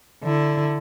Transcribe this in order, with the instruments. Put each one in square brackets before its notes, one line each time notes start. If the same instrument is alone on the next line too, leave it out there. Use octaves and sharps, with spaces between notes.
[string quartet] D3 E4